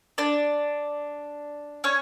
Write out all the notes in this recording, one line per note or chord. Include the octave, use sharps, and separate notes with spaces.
D4 D5
C#4 C#5